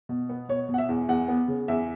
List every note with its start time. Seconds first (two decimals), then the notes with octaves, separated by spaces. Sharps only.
0.09 B2
0.29 B3
0.49 B2 C#5
0.69 B2
0.74 F#5
0.78 E5
0.89 E2
1.09 E2 F#5
1.28 B3
1.48 C#3
1.68 E2 E5